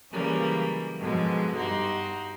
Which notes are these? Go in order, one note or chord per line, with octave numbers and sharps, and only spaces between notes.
C#3 E3 F#3 G3 A#3 C#4
G#2 B2 D3 F3 F#3 G#3
G2 D#4 F#4 G4 C6